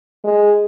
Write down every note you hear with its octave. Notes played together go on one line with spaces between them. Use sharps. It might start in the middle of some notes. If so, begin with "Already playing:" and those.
G#3